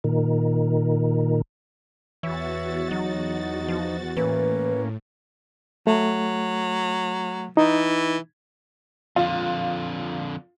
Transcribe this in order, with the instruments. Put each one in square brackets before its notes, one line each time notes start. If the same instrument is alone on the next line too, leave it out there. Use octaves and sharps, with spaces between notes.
[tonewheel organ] A#2 D#3
[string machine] E2 F#4 A6 [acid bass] E3 [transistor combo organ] C#5 E5
[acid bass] F#3 [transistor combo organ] D#4
[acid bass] F3
[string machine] A2 [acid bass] E3 [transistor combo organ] A#3 C#4 [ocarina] B4
[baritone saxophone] F#3 [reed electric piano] A3
[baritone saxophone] E3 [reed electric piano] D#4
[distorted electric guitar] F2 D3 [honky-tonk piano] F4